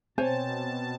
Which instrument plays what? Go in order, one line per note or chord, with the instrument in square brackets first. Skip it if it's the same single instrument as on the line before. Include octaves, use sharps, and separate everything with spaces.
[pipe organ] B2 A5 [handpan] C4 [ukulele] C5 C#5 G#5